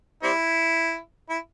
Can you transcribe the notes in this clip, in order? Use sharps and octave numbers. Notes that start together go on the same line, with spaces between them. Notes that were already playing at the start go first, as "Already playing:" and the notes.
G3 C4 E4
E4